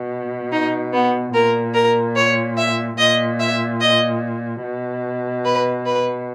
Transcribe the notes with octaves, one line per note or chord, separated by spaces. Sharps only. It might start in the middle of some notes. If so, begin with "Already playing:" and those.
Already playing: B2
D#4
B3
A#2 A#4
A#4
C#5
E5
A#2 D#5
E5
D#5
B2
B4
B4